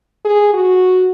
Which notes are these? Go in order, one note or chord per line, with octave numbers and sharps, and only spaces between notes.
G#4
F#4